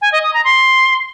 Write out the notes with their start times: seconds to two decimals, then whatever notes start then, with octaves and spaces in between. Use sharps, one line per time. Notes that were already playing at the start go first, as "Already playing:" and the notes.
0.02 G#5
0.12 D#5
0.23 D#6
0.34 A#5
0.44 C6